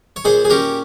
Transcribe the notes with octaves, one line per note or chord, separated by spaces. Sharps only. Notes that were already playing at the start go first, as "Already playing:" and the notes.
C#5
A#2 G#4 C5
G#4
C#4 G4 A#4